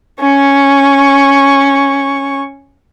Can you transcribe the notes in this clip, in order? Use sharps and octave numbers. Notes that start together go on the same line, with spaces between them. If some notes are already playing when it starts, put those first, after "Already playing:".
C#4 C#6